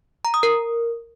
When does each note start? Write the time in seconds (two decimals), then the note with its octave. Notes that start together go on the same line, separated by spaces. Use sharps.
0.25 A#5
0.34 D#6
0.43 A#4